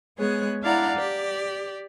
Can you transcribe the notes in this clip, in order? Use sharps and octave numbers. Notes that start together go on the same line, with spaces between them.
G#3 B3 G#4 C#5 F#6
D4 E4 D5 F5 F#5 A#5
G4 D5